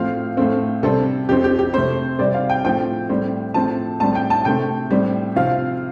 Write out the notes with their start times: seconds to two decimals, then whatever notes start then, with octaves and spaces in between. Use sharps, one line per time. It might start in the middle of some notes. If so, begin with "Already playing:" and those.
Already playing: A2 F3 C4 F5
0.37 A2 A3 C4
0.83 C3 G3 C4 A4
1.29 F2 F3 C4 G4
1.44 G4
1.58 G4
1.73 C3 A3 C4 C5
2.19 C3 G3 C4 D5
2.34 F5
2.50 G5
2.64 A2 F3 C4 G5
3.09 A2 G3 C4
3.54 A2 F3 C4 A5
4.00 A2 G3 C4 A5
4.15 G5
4.30 A5
4.45 C3 A3 C4 G5
4.90 A2 G3 C4
5.36 C3 F3 C4 F5